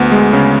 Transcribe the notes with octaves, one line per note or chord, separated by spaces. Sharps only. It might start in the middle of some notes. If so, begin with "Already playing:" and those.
Already playing: D2 B3
G#3
C#3